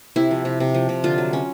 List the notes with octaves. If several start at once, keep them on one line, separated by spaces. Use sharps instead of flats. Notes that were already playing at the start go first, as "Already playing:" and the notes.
C3 E4
F3
C3
C3
F3
C3
D3 F4
F#3
C#4